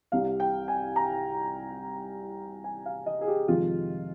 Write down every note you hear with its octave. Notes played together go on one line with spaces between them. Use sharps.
C2 C3 G3 F5
G5
G#5
A#5
G#5
F5
D#5
G#4
G4
F2 C3 D#3 G#3 F4